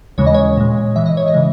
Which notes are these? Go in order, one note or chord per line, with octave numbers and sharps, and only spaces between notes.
D#2 C#3 E3 G#3 C#5
D#5
C#5
A#2 G#3
G#2 E3 G#3 E5
D#5
C#5
D#5
C#3 E3 G#3